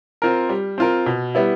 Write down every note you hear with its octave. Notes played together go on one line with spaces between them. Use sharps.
C4 F4 A#4
G3
C4 F4 A#4
B2
G3 B3 E4